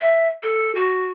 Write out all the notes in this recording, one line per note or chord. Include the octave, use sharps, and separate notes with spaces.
E5
A4
F#4